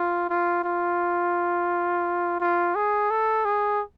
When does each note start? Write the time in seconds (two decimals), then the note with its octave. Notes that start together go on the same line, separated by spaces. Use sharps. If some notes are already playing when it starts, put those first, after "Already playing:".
Already playing: F4
0.30 F4
0.64 F4
2.40 F4
2.75 G#4
3.11 A4
3.45 G#4